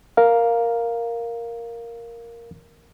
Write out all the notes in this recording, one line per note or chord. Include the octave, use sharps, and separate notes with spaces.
A#4 F5